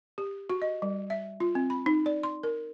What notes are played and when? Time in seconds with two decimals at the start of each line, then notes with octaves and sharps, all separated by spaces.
0.18 G4
0.50 F#4
0.62 D#5
0.82 G3
1.10 E5
1.40 F4
1.55 C4
1.70 B5
1.86 D#4
2.06 D5
2.23 C6
2.43 A#4